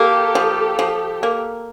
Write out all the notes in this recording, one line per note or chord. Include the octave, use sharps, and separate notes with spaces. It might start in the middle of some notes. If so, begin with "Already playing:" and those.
Already playing: A#3 G4 A4
F3
F3
A#3